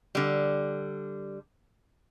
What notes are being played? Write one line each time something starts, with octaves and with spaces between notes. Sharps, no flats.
D3 G3